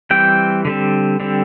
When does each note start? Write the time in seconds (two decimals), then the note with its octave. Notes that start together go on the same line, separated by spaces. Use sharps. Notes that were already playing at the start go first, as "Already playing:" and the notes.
0.11 E3 G3 C4 G5
0.65 D3 G3 C4
1.20 D3 G3 C4